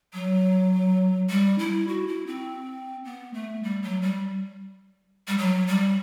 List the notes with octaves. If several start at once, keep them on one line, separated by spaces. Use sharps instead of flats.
F#3
G3
E4
F#4
E4
C4
B3
A3
G3
F#3
G3
G3
F#3
G3